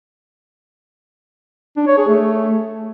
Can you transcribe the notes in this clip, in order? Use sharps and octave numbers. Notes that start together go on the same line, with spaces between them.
D4
C#5
G#4
A3